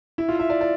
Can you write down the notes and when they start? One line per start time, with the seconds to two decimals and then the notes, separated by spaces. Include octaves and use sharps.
0.18 E4
0.28 F4
0.39 E5
0.50 D5
0.61 D5